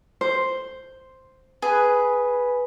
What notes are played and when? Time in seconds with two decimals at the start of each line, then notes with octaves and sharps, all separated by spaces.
0.21 C5
1.62 G#4 B4